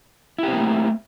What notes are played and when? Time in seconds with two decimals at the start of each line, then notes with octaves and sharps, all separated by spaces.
0.38 E4
0.43 G4
0.48 C4
0.53 A#3
0.57 A3